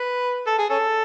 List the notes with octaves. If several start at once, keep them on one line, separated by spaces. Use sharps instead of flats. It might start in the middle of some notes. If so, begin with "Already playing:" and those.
Already playing: B4
A4
G#4
C#4 A4